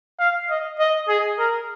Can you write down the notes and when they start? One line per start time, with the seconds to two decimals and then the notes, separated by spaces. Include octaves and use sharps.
0.20 F5
0.50 D#5
0.79 D#5
1.09 G#4
1.39 A#4